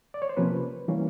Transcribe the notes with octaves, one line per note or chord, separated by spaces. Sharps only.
D5
C#5
C5
C3 F3 A#3 C#4 B4
E3 G3 A#3 C#4